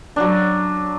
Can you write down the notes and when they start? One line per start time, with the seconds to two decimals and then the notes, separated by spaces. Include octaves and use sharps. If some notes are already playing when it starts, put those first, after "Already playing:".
0.16 F#3 D4